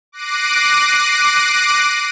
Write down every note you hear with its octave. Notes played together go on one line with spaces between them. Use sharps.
D6 F#6 A#6 C7 D7 D#7